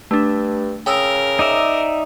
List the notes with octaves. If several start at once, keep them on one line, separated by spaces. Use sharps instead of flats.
G2 A3 D4
C#3 A#4 G5 D#6 E6
D#4 D5 E5